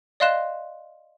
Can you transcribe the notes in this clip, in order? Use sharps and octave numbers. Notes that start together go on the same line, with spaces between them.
D5 D#5 F5 C6 F#6 E7